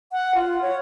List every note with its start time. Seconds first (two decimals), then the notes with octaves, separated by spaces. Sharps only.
0.12 F#5
0.35 F4
0.62 C#5